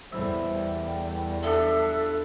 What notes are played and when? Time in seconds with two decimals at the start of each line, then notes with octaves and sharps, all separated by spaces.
0.12 E2 A2 E3 G3 C5 E5
0.86 G5
1.43 F3 D4 A4 E5